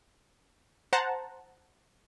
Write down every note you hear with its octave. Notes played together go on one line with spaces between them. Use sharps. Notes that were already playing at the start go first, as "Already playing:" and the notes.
C5 F#5 A5 A#5